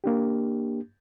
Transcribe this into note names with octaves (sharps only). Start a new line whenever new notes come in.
A#3 D4 G4